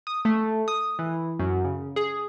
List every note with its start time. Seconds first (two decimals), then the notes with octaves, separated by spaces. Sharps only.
0.07 D#6
0.25 A3
0.68 D#6
0.99 E3
1.39 F#2
1.64 C#3
1.96 G#4